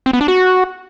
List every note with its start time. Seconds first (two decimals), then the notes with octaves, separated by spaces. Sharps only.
0.06 C4
0.13 B3
0.21 D4
0.28 F#4